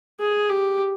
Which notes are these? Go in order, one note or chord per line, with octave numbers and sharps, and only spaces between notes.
G#4
G4